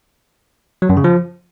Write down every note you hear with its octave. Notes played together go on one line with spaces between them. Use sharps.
F#3
F#2
C#3
F3